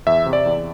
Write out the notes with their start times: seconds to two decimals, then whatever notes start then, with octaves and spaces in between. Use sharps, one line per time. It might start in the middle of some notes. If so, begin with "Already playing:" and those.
0.07 E2 E5
0.26 C3
0.33 D5
0.46 E2